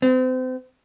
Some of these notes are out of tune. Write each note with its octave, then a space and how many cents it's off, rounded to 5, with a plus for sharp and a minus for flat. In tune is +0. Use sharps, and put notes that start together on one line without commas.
C4 -35